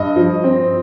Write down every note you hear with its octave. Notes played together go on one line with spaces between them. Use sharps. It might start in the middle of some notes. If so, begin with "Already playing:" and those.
Already playing: G2 D#5
F3
C4